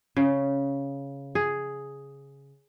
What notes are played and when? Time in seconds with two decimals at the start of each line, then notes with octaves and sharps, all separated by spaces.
0.17 C#3
1.35 G#4